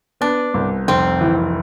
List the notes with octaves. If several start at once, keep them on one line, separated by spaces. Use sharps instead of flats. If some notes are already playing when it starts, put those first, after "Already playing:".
B3 D4
C2
F1 C4
E3